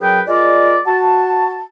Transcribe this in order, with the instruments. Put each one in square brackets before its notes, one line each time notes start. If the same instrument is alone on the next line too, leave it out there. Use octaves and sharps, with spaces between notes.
[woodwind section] F#2 F#3 G#4 B4 G5
G#3 F4 A#4 D5
F#4 A5